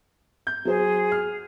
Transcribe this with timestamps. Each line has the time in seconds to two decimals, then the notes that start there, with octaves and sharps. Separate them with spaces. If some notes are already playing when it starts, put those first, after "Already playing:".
0.47 G6
0.65 F#3 G#4 C5
1.12 F6